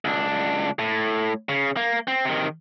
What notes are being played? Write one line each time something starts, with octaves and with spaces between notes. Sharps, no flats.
C#2 D4
A2
C#3
A#3
C4
C3 D#3